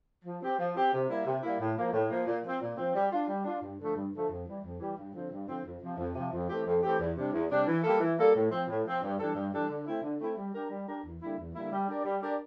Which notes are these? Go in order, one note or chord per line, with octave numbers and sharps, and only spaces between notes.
F3
C4 G4
F3
C4 G4
C3
G3 A#3 E4
C3
G3 A#3 E4
A2
F3 A#3
A2
F3 A#3
A#2
F3 C4
A#2
F3 C4
G3
D4 F4
G3
D4 F4
G2
D3 F3 A3
G2
D3 F3 A3
F2
E3 G3
F2
E3 G3
G2
D3 F3 C4
G2
D3 F3 C4
F2
C3 F3
F2
C3 F3
F2
E3 A3 C4 G4
F2
E3 A3 C4 G4
E2
C3 G3 D4
E2
C3 G3 D4
E3
G3 A#3 F4 A4
E3
G3 A#3 F4 A4
A2
F3 C4
A2
F3 C4
G2
E3 G3 D4 A4
G2
E3 G3 D4 A4
D3
A3 C4 E4
D3
A3 C4 E4
G3
D4 G4 A#4
G3
D4 G4 A#4
E2
D3 G3 A#3 E4
E2
D3 G3 A#3 E4
G3
D4 G4 A#4 D5
G3
D4 G4 A#4 D5